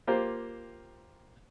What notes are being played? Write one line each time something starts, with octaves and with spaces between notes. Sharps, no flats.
A#3 F4 G4 C5